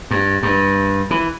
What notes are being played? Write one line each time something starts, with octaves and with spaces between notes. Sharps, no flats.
G2
G2
E3